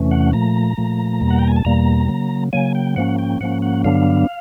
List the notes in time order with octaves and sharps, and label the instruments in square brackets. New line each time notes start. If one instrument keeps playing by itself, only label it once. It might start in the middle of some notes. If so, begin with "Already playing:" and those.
Already playing: [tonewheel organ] E2 C3 E3 A3 C#4
F#5
A#2 F3 A3 A#5
A#2 F3 A3
E2 B2 G3 A#3
F#5
G5
G#5
A5
E2 B2 G3 A#3 A#5
C#3 F#3 A#3
C#3 F#3 A#3 G#5
G5
G#2 F3 A#3 C#4 F#5
G5
G#2 F3 A#3 C#4 F#5
F#5
G2 D3 F#3 B3 D4 F5